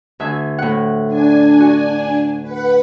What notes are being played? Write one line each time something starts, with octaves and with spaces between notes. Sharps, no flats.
D2 E5 G#5
A2 F#5
D4 G#5
F#4
B4 F#5